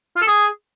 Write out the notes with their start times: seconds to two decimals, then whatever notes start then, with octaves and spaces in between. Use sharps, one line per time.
0.16 F4
0.22 A4
0.27 G#4